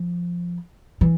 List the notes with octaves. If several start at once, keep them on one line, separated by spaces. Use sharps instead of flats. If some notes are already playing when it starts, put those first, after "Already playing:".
Already playing: F3
E3